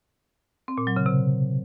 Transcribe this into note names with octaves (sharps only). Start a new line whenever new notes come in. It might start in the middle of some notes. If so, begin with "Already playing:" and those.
C4
A#2
F#3
C#3
C3